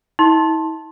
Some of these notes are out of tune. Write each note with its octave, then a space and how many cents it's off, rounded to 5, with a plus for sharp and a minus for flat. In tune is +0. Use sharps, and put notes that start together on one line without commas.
E4 -40 C6 +20